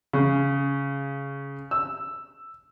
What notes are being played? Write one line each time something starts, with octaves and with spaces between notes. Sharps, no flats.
C#3
E6